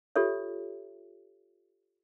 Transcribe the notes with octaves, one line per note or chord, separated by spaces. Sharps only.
F4 G4 A4 C#5 E5